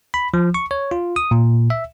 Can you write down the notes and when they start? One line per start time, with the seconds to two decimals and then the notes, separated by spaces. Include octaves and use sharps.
0.14 B5
0.34 F3
0.54 C#6
0.71 C#5
0.91 F4
1.16 D#6
1.31 A#2
1.70 E5